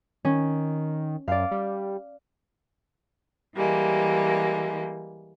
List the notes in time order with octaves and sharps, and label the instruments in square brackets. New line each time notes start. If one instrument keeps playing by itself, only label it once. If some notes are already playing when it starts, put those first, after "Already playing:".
[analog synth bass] D#3 [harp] C#4
[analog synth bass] F#2 [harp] D5 F5
[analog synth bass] G3
[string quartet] E3 G3 G#3 A#3